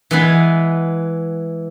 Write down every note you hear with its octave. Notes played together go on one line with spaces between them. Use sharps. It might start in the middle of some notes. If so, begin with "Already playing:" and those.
E3 G#3 B3